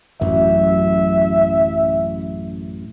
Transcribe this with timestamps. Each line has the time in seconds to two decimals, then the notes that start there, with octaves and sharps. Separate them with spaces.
0.21 A1 F#2 F#3 E5